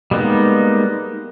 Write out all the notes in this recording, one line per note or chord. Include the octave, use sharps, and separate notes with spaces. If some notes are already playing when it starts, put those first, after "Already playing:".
G3 G#3 A#3 B3 D#4